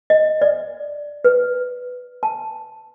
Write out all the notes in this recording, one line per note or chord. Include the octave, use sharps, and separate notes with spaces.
D#5
D5
B4
A5